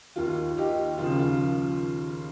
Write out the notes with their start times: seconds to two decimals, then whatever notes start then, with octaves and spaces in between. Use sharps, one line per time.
0.16 D#2 D#3 F4
0.58 D#4 G4
0.98 D#2 C#3 F3 F4
1.19 F4